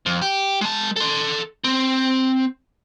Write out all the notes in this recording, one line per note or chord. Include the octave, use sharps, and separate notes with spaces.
F2
G4
G#3 A5
A4 C6
C4